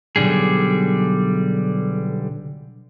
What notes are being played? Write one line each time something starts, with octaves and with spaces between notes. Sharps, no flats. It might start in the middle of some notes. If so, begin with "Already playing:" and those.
B1 G2 D3 G3 G#4